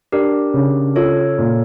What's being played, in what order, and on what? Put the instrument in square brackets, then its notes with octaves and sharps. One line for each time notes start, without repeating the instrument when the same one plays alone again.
[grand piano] D4 [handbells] G4 A#4
[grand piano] C#3
[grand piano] F4 [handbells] A4 C#5
[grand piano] A#2